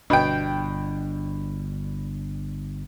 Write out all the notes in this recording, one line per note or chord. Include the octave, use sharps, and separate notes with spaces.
G1 B2 D4 G5